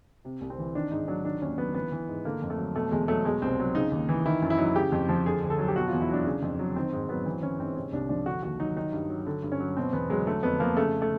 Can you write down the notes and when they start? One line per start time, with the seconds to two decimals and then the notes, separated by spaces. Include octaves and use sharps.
0.25 C3
0.41 C2
0.50 C4
0.58 E3
0.75 D#3 D4
0.91 G#2 D#4
1.08 F#3 D4
1.25 D#3 D4
1.41 D#2 C#4
1.58 F#3 B3
1.74 E3 B3
1.92 E3
2.08 G#2
2.25 D3 A#3
2.42 F2
2.50 A3
2.58 F#3
2.75 B2 A3
2.91 E2 G#3
3.08 F#3 A3
3.25 B2 G#3
3.42 C2 C4
3.59 F#3
3.75 C#3 D#4
3.91 D#2
4.09 E3
4.25 D#3 E4
4.42 F#2
4.50 E4
4.58 F#3 D#4
4.66 E4
4.76 C#3 G4
4.92 F2
5.09 F3
5.25 D3 G#4
5.42 D2
5.50 A4
5.58 F#3
5.68 G4
5.76 B2 F#4
5.88 E2 F4
6.01 E4
6.09 F#3 D4
6.26 C#3
6.42 F2
6.59 F#3
6.76 D#3 C4
6.92 G#2
7.09 F#3 B3
7.26 E3 C4
7.43 E3 C#4
7.60 G#2 C4
7.76 C3 C#4
7.93 C2 D4
8.09 F3 D4
8.26 D3 F#4
8.43 D#2 F#4
8.60 F#3 D#4
8.76 D#3 D#4
8.93 G2
9.10 F#3
9.26 D3
9.43 G2
9.52 C#4
9.60 F#3
9.77 B2 C4
9.93 E2 B3
10.10 F#3 G#3
10.27 D3 A3
10.43 F2 B3
10.60 F3 A#3
10.77 C#3 A3
11.02 A3